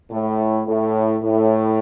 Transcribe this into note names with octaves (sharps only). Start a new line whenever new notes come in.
A2
A2
A2